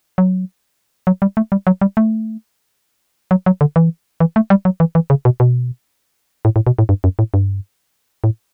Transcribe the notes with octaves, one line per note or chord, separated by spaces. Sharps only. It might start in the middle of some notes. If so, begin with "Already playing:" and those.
F#3
F#3
G3
A3
G3
F#3
G3
A3
F#3
F#3
D3
E3
E3
A3
G3
F#3
E3
E3
C#3
B2
B2
A2
A2
B2
A2
G2
F#2
A2
G2
A2